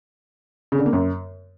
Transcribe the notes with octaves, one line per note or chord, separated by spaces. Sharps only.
C#3
D3
A#3
F#2